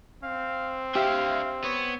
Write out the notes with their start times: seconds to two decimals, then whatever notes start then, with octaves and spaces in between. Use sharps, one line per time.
0.23 C4 F5
0.95 D4 G4 E5 F5
1.64 B3 C#5